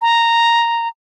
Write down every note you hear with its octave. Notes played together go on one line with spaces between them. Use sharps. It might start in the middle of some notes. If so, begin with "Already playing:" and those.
A#5